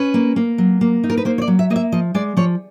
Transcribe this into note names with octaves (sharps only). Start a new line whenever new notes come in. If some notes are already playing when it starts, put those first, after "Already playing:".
Already playing: C#4 B4
A#3
A#3
F#3
A#3
D#4
A#4
B4
A#3 C5
C#5
D5
F#3
E5
A#3 D#5
E5
F3 D#5
G#3 D5
F3 C#5